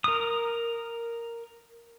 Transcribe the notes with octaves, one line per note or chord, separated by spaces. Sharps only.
A#4 D#6